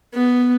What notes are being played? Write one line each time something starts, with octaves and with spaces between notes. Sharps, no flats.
B3